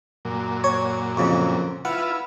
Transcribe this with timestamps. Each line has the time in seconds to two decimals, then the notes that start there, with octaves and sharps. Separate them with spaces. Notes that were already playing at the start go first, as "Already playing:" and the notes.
0.25 F#2 A#2
0.64 C#5
1.17 F2 C#3
1.85 E4 F4 B4 F#5